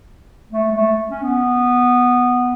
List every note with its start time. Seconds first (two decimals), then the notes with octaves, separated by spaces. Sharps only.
0.52 A3
0.71 G#3
0.76 A3
1.10 C#4
1.22 B3